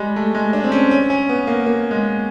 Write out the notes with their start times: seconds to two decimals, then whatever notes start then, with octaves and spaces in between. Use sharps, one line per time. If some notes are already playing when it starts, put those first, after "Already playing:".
Already playing: G3 G#3
0.16 A3
0.35 G#3
0.53 D4
0.64 C4
0.72 C#4
0.91 C#4
1.10 C#4
1.29 B3
1.47 A#3
1.66 A#3
1.91 G#3